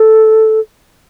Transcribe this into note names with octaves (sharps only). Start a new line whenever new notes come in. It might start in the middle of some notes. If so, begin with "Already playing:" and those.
Already playing: A4